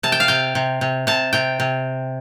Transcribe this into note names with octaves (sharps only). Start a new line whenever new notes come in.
C3 A5
G5
F5
C3 G5
C3
C3
C3 A5
C3 G5
C3